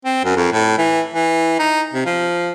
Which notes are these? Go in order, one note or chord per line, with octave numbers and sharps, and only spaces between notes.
C4
F#2
F2
A2
E3
E3
D#4
C3
F3